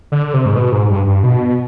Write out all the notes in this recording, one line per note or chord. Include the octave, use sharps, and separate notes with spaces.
D3
C3
G#2
B2
G#2
G2
G2
B2